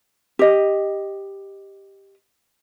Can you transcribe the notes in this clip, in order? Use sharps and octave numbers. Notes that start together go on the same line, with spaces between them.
G4 D#5